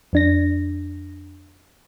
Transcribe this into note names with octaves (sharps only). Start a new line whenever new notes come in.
F2 D4 A#6